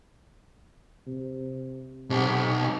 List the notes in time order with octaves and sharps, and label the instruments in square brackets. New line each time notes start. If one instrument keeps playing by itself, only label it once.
[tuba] C3
[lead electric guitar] B1 [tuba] C3